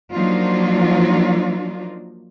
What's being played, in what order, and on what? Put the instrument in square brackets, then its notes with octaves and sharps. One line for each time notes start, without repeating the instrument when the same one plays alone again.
[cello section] F3 F#3 A#3 D4 D#4 F4